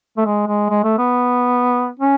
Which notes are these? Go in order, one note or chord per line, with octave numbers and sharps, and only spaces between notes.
A3
G#3
G#3
G#3
A3
B3
C#4